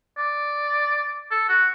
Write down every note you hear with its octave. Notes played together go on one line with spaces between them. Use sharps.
D5
A4
F#4